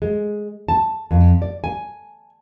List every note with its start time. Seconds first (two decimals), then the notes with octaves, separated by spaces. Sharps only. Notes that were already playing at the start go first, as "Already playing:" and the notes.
0.02 G#3
0.69 A5
1.11 F2
1.42 D5
1.64 G#5